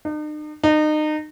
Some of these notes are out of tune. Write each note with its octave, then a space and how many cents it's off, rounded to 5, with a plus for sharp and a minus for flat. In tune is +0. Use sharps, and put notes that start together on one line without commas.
D#4 -45
D#4 -30